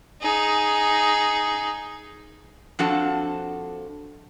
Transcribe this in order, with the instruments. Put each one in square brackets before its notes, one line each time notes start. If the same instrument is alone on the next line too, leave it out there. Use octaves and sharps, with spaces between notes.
[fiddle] D#4 G#4
[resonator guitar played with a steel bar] F2 F3 D4 F#4 A4 F#5